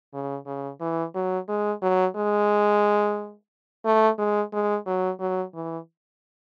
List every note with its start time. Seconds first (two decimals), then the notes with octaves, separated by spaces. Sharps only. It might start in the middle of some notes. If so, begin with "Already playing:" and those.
0.14 C#3
0.47 C#3
0.81 E3
1.15 F#3
1.49 G#3
1.82 F#3
2.16 G#3
3.85 A3
4.18 G#3
4.53 G#3
4.87 F#3
5.20 F#3
5.54 E3